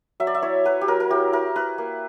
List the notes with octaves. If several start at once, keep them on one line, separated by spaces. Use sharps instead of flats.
F#3 E5
D5
E5
E4 C#5
F#3 B4
G4
F#3 A#4
A#4
E4 G4
E4 A#4
E4 B4
A#3